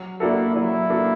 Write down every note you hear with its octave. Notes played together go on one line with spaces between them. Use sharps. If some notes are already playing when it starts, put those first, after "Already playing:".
Already playing: F#3
A#3 D4 E4 F#4 A4
F#3 E4
A#3 D4 F#4 A4